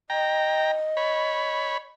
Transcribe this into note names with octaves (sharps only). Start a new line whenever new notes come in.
D#5 G5 A#5
C#5 B5